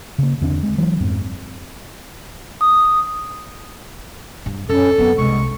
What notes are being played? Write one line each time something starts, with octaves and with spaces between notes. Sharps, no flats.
C#3 A#3
E2 D3 C4 D4
G#3
E3 F#3 G#3
F2 G#2 C4
D#6
G2
F#2 C#4 A4
F#2 B3 C4
C2 G#3 C#6